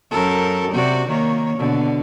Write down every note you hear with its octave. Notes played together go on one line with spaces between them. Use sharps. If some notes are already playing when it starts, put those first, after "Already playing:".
F#2 A4 A#4
C3 F#4 D5
D#3 A#3 C#5
B2 D3